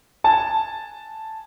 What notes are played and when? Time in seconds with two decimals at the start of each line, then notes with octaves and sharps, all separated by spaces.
0.24 G#5 A5